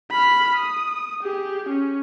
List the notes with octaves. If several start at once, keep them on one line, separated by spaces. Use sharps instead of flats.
B5 F6
D#6
G4 G#4
C#4